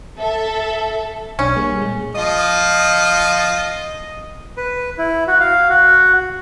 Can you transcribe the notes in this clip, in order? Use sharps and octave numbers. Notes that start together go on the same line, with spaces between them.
A4 E5
B1 C#4 D4 C#5
G3 A#3 G#4
A#2 G#3
F3 F4 D#5
B4
E4
F#4
F5
F#4